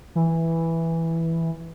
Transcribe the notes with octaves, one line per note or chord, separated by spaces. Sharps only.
E3